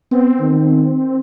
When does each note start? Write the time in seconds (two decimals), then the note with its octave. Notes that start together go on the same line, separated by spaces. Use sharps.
0.11 B3 C4
0.40 D#3